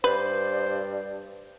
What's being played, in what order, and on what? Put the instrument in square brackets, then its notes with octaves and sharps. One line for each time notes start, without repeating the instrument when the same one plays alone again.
[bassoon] G2 [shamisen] B4 [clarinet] C5 [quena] D5